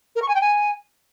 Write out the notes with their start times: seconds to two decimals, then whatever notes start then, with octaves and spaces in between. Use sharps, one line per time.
0.16 A#4
0.22 C#6
0.28 G#5
0.35 G5
0.41 G#5